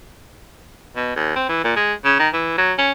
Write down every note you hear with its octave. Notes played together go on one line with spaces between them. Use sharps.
B2
D#2
C4
E3
A#2
G#3
C#3
D#3
E3
F#3
C#4